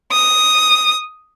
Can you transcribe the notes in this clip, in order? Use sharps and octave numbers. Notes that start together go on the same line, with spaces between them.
D#6